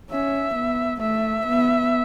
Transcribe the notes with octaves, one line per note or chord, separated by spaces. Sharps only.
C#4 E5
B3
A3 E5
B3